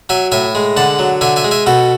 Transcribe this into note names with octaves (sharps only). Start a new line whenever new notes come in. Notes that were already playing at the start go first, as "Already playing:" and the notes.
F#3 E5 G#5
A2 E5 G#5
G#3
D3 F#5 A5
F#3
D3 E5 G#5
E5 G#5
G#3
E5 G#5
B2 F#4 A4